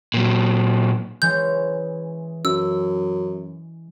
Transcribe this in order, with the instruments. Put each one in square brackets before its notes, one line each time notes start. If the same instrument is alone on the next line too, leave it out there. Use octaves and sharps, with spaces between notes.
[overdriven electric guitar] A#2 F#3
[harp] E3 G#3 C#4 [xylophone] G6
[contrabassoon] F#2 [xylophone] E6